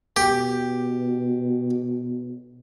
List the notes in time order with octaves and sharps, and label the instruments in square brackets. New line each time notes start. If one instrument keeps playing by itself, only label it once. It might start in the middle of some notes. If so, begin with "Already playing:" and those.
[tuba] B2 [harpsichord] G4